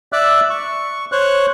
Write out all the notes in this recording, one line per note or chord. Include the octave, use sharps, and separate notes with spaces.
D5 E5 D6 E6 F#6
C#6
C5 C#5 C#6 F#6